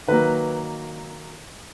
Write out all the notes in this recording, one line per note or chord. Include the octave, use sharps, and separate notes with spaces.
D#3 F#3 A#3 B4